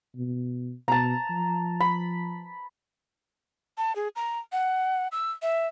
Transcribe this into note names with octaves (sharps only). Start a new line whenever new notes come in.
B2
B2 A5 A#5
F3
B5
A5
G#4
A#5
F#5
E6
E5